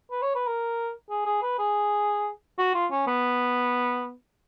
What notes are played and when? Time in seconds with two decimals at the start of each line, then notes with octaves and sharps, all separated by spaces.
0.11 B4
0.22 C#5
0.35 B4
0.47 A#4
1.10 G#4
1.26 G#4
1.42 B4
1.59 G#4
2.58 F#4
2.74 F4
2.91 C#4
3.07 B3